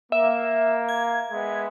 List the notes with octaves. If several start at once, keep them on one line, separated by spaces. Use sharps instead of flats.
A#3 E5
G#6
G#3 B3 E5